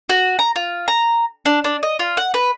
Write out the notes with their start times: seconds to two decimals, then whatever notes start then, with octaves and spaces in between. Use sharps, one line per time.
0.09 F#4
0.39 A#5
0.56 F4
0.88 A#5
1.46 D4
1.64 D4
1.83 D#5
1.99 F4
2.17 F#5
2.34 B4